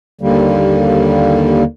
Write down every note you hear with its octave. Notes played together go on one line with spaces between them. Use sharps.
D#2 D3 G3 A#3